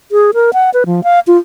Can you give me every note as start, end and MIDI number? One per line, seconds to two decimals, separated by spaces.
0.12 0.31 68
0.34 0.51 70
0.53 0.70 78
0.74 0.84 71
0.86 1.04 53
1.04 1.20 77
1.27 1.38 65